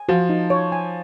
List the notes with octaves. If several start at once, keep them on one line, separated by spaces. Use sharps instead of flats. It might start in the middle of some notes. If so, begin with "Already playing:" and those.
Already playing: G#5
F3 F#4
D#4
C#5
G#5